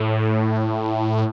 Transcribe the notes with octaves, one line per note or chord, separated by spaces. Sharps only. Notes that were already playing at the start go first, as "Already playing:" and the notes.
Already playing: A2